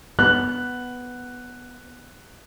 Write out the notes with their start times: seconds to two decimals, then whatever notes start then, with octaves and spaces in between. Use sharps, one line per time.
0.19 B3 F#6